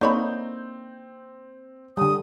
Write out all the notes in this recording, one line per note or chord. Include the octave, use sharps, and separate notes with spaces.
D3 A#3 C4 D#4 C#5 B5 G6
D3 G3 D#6